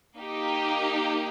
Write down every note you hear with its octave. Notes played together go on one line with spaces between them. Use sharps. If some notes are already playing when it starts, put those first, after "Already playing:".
A#3 D#4 G4